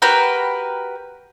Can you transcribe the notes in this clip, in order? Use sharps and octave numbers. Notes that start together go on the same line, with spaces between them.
F#4 G4 A#4 B4